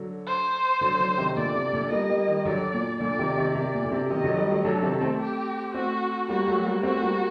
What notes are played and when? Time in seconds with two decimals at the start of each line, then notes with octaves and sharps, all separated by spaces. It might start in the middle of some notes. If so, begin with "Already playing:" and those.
Already playing: D3 F#3
0.27 C5
0.81 D3 F#3
1.00 D3 F#3
1.18 C3 D#3
1.36 A#2 D3 D5
1.55 C3
1.72 A#2 D3
1.91 G3 A#3 D#5
2.09 G3 A#3
2.27 D#3 G3
2.45 D3 F#3 D5
2.74 A#2
3.00 A#2 D3 D5
3.19 C3 D#3
3.37 C3 D#3
3.55 C3 D5
3.74 A#2
3.85 D3
3.92 C3
4.10 C3 D#3 D#5
4.24 D3 F#3
4.38 D#3 G3
4.51 F#3 A3
4.65 D3 F#3 A4
4.83 C3 D#3
5.01 A3 C4
5.20 G4
5.74 A3 C4 F#4
6.29 G3 A#3 F#4
6.47 F#3 A3
6.65 G3 A#3
6.83 A3 C4 F#4
7.02 G3 A#3